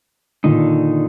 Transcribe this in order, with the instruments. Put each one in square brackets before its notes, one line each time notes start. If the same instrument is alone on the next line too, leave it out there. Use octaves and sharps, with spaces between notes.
[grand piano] A#2 D#3 [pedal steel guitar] D3 D#4